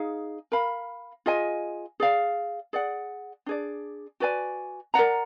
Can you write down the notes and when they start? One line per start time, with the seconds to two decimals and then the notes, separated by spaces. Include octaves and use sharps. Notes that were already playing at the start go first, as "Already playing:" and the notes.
Already playing: D#4 G#4 F5
0.52 A#4 F5 B5
1.26 F4 G#4 D#5 G#5
2.00 G#4 D5 F5
2.73 G#4 D5 F#5
3.46 D4 G#4 D5
4.20 F#4 B4 D5 G#5
4.94 A#4 D5 F#5 A#5